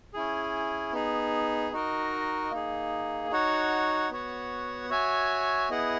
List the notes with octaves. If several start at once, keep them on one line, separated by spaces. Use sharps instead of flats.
C#4 E4 G#4
B3 D#4 G#4
D#4 F#4 A#4 D#5
A#3 D#4 G#4
D#4 F#4 C#5 F#5
B3 F#4 C#5 F#5
F#4 C#5 E5 G#5
B3 E4 G#4 D#5 F#5